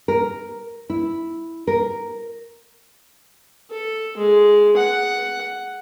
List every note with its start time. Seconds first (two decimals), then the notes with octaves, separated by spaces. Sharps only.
0.08 A#4
0.90 E4
1.67 A#4
3.71 A4
4.17 G#3
4.76 F#5